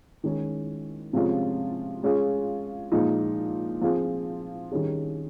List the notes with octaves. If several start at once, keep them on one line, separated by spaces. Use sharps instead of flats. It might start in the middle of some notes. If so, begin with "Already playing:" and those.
D#3 G#3 C#4 G#4
C3 F3 G#3 C#4 F4
G#3 C#4 F4 G#4
A#2 F3 G#3 D#4
F3 C4 F4 G#4
D#3 G3 C#4 G#4